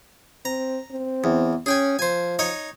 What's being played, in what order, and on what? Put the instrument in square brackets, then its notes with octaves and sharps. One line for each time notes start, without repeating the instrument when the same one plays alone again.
[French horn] C4 [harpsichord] A#5
[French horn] C4
[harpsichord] E2
[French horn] C#4 [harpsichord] G#4 G5 G#5
[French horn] F3 [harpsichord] C5 G#5
[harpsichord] D#4 C#5 D#5